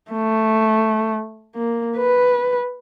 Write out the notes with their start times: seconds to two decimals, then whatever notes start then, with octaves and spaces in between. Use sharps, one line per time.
0.11 A3
1.55 A#3
1.97 B4